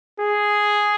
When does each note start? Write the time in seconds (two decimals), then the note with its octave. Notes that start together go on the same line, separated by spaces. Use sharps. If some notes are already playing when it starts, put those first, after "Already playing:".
0.21 G#4